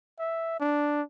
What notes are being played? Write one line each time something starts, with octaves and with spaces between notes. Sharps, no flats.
E5
D4